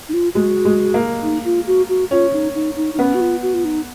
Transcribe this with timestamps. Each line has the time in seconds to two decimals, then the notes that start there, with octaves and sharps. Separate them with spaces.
0.09 D#4
0.13 F4
0.35 G#3 F#4
0.65 G#3
0.94 A#3
1.23 D#4
1.45 F4
1.67 F#4
1.89 F#4
2.11 C#4 F4
2.33 D#4
2.55 D#4
2.76 D#4
2.94 D#4
2.99 B3 C#4
3.14 F#4
3.20 F4
3.42 F#4
3.54 F4
3.65 D#4